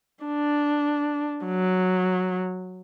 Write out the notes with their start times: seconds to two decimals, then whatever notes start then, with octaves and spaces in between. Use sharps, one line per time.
0.24 D4
1.46 F#3